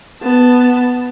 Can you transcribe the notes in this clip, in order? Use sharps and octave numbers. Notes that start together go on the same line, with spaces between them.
B3 A5